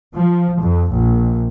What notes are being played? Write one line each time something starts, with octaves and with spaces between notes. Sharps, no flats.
F3
F2
A#1